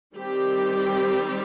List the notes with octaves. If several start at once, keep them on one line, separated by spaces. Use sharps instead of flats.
D#3 G3 C4 G4